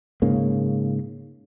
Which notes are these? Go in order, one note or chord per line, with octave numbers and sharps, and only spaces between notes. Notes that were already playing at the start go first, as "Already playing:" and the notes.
G#2 C#3 A#3